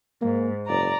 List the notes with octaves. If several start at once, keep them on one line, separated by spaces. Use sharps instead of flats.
G#2 A#3
F#1 D5 A#5